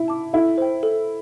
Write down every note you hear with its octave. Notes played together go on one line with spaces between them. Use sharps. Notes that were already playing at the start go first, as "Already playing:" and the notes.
Already playing: E4
A5 D6
E4 A4
C5 G5
A4